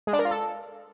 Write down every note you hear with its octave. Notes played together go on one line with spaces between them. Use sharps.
G#3
D4
A#4
F4
A4